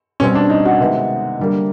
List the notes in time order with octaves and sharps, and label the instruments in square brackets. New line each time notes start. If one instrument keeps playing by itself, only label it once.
[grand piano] B2 G3 C4 C#4
D4
D#4
F#4
C3 D#3 G#3 B3
D3 G3 A#3